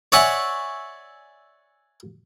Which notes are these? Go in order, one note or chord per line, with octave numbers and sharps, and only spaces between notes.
C#5 D5 E5 F#5 G#5 C#6